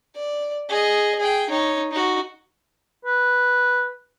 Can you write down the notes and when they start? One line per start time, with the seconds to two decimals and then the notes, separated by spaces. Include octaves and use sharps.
0.15 D5
0.69 G#4 D#5
1.19 G#4 G5
1.50 D#4 C#5
1.91 D#4 F#4
3.05 B4